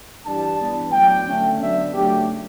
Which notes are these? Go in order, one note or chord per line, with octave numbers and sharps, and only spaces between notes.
G2 E3 G3 D4 A5
G2 E3 B3 D4
A2 F#3 B3 D4 G5
D3 A3 C#4
D3 F#3 B3 D4 E5
C#3 F#3 A3 D4 G4